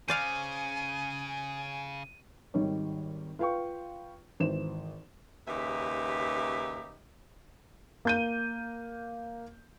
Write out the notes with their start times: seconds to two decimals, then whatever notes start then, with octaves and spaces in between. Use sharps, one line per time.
0.08 C#3 C5 D5 F5 G#5 D#7
2.54 G#1 D#3 G3 C#5
3.39 F4 B4 F5 G5 C#6
4.40 G#1 E3 C5 E7
5.47 D#2 C#3 D#4 G4 B4 E5
8.05 A#3 G6 D#7